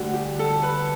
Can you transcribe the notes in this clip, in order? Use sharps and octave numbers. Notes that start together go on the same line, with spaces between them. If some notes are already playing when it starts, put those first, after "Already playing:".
Already playing: D2 D3 G3 F#4
G4
A4
B4